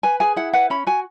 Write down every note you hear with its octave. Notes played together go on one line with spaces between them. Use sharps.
B4 G#5
G#4 G#5
E4 F#5
B4 F#5
C#4 B5
F#4 G#5